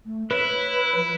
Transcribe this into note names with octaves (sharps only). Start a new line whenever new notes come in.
A3
E4 B4 C#5
F3